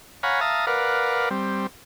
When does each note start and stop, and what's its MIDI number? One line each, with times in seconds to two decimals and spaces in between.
0.23 0.40 73
0.23 0.40 77
0.23 0.40 78
0.23 0.40 80
0.23 0.40 82
0.23 0.40 83
0.41 0.66 76
0.41 0.66 77
0.41 0.66 81
0.41 0.66 82
0.41 0.66 87
0.67 1.29 70
0.67 1.29 71
0.67 1.29 74
0.67 1.29 77
0.67 1.29 78
1.31 1.67 55
1.31 1.67 60